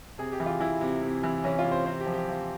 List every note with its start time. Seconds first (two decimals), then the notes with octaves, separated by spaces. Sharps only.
0.18 C3 G#4
0.32 G4
0.40 E3
0.46 F4
0.60 E3 E4
0.81 C3
1.02 C3
1.23 E3
1.44 E3 C#4
1.59 F4
1.65 C3
1.71 C5
1.86 C3 C5
2.00 G4
2.06 F3
2.14 G4
2.29 F3